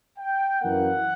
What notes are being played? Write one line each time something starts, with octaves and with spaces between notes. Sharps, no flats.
G5
F#2 E3 A#3 F#5